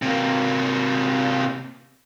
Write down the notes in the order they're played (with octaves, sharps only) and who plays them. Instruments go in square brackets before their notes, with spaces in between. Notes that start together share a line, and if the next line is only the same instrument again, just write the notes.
[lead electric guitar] C3 A#3